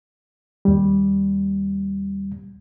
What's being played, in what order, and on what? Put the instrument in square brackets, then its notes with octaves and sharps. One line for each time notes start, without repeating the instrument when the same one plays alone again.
[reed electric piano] D#2 G3